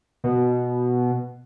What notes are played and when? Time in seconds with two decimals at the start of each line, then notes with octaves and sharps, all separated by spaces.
0.24 B2